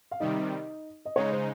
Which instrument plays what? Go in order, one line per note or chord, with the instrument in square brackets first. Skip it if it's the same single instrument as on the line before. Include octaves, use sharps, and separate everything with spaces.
[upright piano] F5
[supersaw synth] C3 D#3 G3 [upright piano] D#4 D#5
[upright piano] D#5
[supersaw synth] C#3 G#3 D#4 [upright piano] C#5
[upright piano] C5